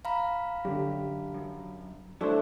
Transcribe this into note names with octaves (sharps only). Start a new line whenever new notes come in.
F5 A#5 B5
F#2 D3 G4
F#2
F#3 A3 D4 E4 C5